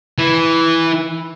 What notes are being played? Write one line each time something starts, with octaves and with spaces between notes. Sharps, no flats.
E3